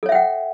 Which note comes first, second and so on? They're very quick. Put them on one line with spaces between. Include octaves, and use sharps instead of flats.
A4 C#5 E5 G5 F#5